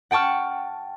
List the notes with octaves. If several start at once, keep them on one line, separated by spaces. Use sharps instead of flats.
F#5 G5 A5 C#6 F6